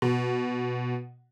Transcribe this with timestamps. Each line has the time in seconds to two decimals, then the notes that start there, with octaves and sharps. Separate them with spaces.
0.02 B2